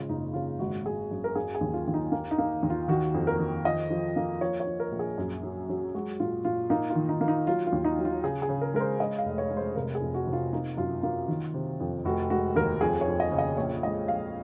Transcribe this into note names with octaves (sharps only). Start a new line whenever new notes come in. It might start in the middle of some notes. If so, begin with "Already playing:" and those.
Already playing: G#1 C#3 F4
F#1 D#4
C#3 F4
G#1 F#4
G#1 G#4
F#2
A#4
A#3 G#4
G#4
D#2
F4
D#2
D#4
A#3
D#4
A#3
D#2
F4
D#3 F#4
F2
A#4
D#3
F3 D#5
F3
A#3
F3 C#5
C#5
F3
A#4
A#1
G#4
F#2
F#3
F#3
G#3 F#4
A#2 F4
A#2 F4
A#3 D#4
F4
D#3
D#4
A#3
D#4
F#3 F4
F4
D#2
D#4
F#3
F4
C#3 G#4
G#4
C#3
A#4
G#3 A#4
C5
G#3 D#5
F5
F1
C#5
G#3
C5
C3 A#4
G#4
F2
F#4
C3
F4
A#3 D#4
F#2 F4
A#3 F4
D#3
C3
F2
F1 F#4
G#3 F#4
D#2 A#4
F2 G#4
C#5
F2
D#5
C#3
D#5
A#1 C#5
G#3 D#5
A#1 F5